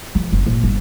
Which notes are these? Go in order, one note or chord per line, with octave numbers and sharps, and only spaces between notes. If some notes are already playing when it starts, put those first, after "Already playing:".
F3
F#1
A#2
G1